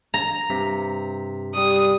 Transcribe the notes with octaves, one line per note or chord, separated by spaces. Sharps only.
A#5
G2 C3 B6
G3 D#6